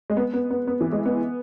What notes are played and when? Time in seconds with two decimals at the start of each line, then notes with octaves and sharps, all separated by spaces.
0.10 G#3
0.17 B3
0.34 B3
0.50 B3
0.67 B3
0.81 E3
0.92 G#3
1.06 B3